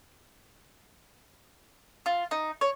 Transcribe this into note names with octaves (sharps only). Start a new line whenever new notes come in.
F4
D#4
C#5